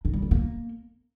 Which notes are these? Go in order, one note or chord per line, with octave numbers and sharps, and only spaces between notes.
D#4
G3
A3
A#3